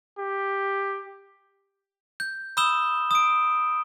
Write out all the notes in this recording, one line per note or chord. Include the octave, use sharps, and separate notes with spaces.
G4
G6
B5 D#6 E6 G6 E7 G7
D#6 D7